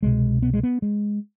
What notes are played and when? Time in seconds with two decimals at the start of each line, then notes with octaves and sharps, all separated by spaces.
0.03 C2 B2 G#3
0.42 B3
0.54 G#3
0.63 B3
0.82 G#3